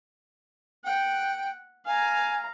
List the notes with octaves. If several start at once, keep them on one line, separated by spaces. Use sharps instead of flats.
F#5 G5
F5 G#5 A#5